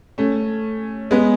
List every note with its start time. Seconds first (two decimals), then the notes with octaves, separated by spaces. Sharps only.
0.18 A3 C#4
1.11 G#3 B3